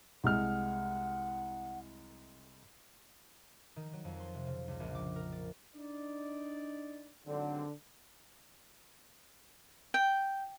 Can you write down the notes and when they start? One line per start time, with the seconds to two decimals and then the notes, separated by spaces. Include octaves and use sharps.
0.24 C2 G#3 F#5 F6
3.76 D#3
3.93 F#3
4.05 F2
4.20 C6
4.34 C3
4.47 C#3
4.68 C#2
4.80 A#1
4.95 D6
5.16 A#4
5.32 D5
5.75 D4 D#4 D5
7.26 G#1 D3 F#3 C4
9.94 G5